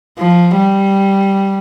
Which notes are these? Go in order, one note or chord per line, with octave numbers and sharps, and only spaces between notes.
F3
G3